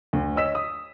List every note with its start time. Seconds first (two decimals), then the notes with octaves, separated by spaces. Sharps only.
0.13 D2
0.36 C#5 D#5 E6 B6 E7
0.55 D#6